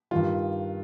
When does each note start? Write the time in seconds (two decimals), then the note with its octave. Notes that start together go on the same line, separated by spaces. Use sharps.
0.11 G2 D#3 G3 F4